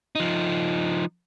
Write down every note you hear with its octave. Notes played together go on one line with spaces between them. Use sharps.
F3 D#4